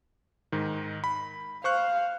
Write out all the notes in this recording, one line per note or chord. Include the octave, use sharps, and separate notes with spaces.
G#2 D#3
B5
C5 F5 C#6 F#6